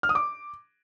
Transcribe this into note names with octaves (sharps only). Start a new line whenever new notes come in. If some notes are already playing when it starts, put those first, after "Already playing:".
F6
D#6
D6